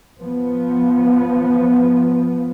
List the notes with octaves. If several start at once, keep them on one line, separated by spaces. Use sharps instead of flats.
F3 B3